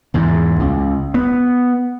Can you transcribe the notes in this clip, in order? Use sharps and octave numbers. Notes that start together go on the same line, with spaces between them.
E2 G#2
C#2
B3